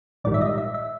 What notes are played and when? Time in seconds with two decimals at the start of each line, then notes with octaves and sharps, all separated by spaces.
0.24 A#1 G#2 D#3 G3 D5
0.34 E5
0.41 D#5
0.58 E5
0.74 E5